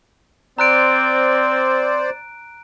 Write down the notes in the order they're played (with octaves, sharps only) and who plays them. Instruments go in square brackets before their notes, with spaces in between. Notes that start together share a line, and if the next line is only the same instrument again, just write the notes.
[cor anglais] C4 [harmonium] C5 D5 [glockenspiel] A#5 F#6 D7